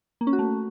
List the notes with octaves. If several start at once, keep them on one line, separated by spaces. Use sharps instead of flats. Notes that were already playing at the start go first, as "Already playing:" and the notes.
A#3
C#4
F#4
A3